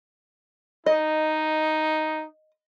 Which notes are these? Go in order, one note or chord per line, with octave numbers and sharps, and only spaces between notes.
D#4 D#5